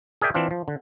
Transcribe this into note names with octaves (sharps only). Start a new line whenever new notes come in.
G#4 A#4 D5 E5 G5 G#5
E3 C4 D4 F4
F3
D3